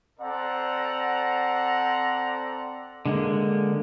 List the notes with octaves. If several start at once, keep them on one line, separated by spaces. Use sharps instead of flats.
C4 A4 C5 D5 F#5 A#5
D3 G#3 A#3